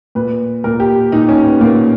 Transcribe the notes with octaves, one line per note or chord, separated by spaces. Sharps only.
A#2 B4
A#2 A#4
G4
A#2 D#4
C#4
B3
A#2 A#3